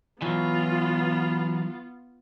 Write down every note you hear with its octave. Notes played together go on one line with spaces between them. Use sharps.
E3 F#3 B3 F4